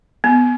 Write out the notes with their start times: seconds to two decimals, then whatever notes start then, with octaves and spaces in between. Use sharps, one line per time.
0.24 B3